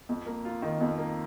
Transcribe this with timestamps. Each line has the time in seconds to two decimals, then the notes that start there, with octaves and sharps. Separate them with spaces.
0.09 F2
0.26 A#3
0.45 F4
0.62 D#3
0.81 F2
0.98 A#3